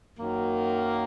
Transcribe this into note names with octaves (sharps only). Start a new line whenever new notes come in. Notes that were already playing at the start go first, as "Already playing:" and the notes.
F#2 D#3 F#3 A#3